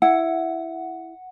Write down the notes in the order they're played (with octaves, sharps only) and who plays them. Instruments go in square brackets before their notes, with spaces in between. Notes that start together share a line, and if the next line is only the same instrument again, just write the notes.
[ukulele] E4 [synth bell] F#5